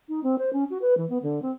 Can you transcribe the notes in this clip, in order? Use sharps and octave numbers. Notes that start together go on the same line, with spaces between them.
D#4
C4
C5
C#4
F#4
B4
E3
B3
D3
C4